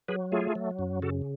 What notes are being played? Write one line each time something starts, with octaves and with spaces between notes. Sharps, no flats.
F#3 G#4 B4
A3 F4 G#4
F#3
F#2
C#3 F#4 A4